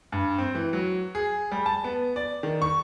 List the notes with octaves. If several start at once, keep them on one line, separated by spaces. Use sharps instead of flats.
G2
C4
E3
F#3
G#4
G3
A5
B3
D5
D#3
C#6